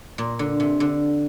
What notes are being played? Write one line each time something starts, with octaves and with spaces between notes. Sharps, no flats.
A#2
D3
C3
D3